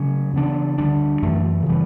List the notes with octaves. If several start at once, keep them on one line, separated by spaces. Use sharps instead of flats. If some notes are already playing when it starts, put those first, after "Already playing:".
Already playing: C#3 F#3 A3 C#4
C#3 E3 B3 D4
D2 D3 G3 D4
F#2 E3 A3
C#3 E3 G3 B3